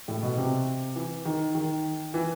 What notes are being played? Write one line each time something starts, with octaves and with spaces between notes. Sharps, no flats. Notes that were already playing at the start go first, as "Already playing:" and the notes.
A2
B2
C3
E3
D#3
D#3
E3